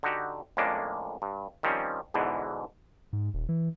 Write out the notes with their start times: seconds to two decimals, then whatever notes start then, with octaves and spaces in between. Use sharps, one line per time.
0.03 D3 D#4 F#4 G4
0.57 F2 A2 G#3 A#3 C#4 D4
1.22 G2
1.63 D#3 F3 G3 C4 C#4
2.14 E2 G#2 B2 D3 E3
3.13 G#2
3.34 D#1
3.49 E3